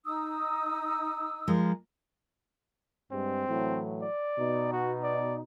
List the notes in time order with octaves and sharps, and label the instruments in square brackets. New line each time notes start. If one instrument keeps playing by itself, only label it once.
[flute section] D#4 D#6 E6
[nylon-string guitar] F3 G#3 A#4
[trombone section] G2 G#3 [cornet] C4
[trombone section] A2 E3 F#3
[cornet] D5
[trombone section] B2 D#4
[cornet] F#4
D5